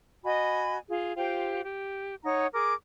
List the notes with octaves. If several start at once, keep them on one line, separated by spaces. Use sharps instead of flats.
F#4 D#5 G#5 B5
F4 G#4
F4 G4 C5 G5
G4
D#4 C#5 F#5 A#5
G#4 A#4 D6